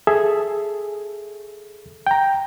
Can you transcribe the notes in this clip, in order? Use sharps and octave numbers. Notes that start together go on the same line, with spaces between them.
G#4 A4 E5
G5 A#5